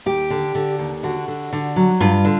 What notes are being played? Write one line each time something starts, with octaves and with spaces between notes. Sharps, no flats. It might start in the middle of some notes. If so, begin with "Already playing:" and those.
D#2 G4
D3
D3
D#2
D3 F#4
D3
D3
F#3
G2 F4
D3